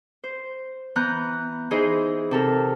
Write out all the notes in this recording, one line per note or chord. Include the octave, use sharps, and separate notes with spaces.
C5
E3 B3 A#5 F#6 G6
E3 D#4 E4 G#4 C5 D#5
C3 A4 A#4